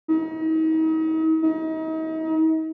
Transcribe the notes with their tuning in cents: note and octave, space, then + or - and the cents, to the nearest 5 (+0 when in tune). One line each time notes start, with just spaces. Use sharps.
D#4 +40
D#4 +40